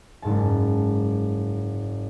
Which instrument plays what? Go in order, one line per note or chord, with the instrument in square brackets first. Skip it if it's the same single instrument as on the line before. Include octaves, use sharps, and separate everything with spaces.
[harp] F#1 G#2 A5